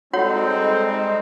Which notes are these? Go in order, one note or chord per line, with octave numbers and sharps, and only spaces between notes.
G3 G#3 C4 D#4 F#4 A4 C#5 F#5